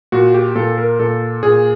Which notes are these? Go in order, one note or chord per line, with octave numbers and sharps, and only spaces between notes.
A#2 F#4
G4
A#2 A4
A#4
A#2 A4
A#2 G#4